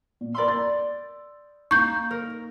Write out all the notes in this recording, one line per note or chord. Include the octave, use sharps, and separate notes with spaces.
A#2
A#4 D5 B5 C6 E6
A6
A#3 D#4 C#6 G6
A#4